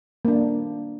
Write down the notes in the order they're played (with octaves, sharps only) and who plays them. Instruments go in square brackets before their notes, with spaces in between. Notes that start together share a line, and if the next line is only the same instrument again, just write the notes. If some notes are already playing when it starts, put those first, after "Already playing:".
[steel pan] A#3 D4